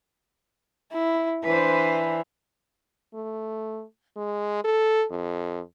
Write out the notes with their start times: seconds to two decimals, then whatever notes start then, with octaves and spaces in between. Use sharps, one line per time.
0.93 E4
1.45 E3 D4 B4 C5
3.14 A3
4.17 G#3
4.65 A4
5.10 F2